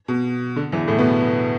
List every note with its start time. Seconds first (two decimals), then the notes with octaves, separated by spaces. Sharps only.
0.08 B2
0.56 D3
0.72 E2 E3
0.88 A2 A3
0.98 B2 B3